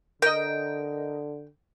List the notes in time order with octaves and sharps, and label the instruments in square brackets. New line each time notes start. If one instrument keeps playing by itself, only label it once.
[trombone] D3 [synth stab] A#4 D#5 [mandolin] G5